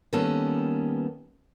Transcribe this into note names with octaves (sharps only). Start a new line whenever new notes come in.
D#3 G3 A#3 B3 C#4 A4